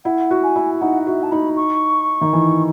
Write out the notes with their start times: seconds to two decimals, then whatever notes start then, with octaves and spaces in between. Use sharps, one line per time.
0.05 E4 F#5
0.31 F#4
0.43 G#5
0.56 E4
0.81 D#4 F#5
1.06 F#4 E5
1.23 A5
1.32 D#4 B5
1.57 C#6
2.21 D#3
2.33 E3